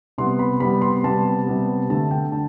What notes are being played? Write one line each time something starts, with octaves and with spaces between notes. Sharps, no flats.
C3 G3 B3 C6
B5
C3 G3 B3 B5
C6
C3 G3 B3 A5
C3 G3 B3
D3 A3 A5
G5
D3 A5